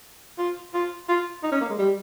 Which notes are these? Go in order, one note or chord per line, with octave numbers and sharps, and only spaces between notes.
F4
F4
F4
D#4
C#4
A#3
G#3
G3